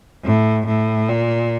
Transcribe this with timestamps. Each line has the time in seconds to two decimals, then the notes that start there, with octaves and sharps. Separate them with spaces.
0.24 A2
0.66 A2
1.09 A#2